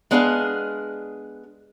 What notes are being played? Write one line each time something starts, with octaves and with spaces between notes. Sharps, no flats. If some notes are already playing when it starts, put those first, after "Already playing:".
G#3 B3 D4 G#4 A4 F5